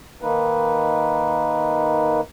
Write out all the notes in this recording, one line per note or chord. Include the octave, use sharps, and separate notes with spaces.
D#3 A#3 D#4 B4